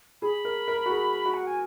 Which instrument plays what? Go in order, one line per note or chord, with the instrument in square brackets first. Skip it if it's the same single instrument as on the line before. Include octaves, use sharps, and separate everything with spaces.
[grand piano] G#4 [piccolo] B5
[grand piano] A#4
A#4
F#4
G#4
F#4
[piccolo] F#5
G#5